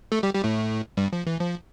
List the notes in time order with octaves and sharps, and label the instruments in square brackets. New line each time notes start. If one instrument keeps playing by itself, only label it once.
[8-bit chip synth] A3 A4
G3 G4
G3 G4
A2 A3
G2 G3
F3
E3
F3